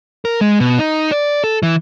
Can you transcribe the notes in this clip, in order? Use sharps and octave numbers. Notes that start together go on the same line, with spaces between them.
A#4
G#3
B2
D#4
D5
A4
E3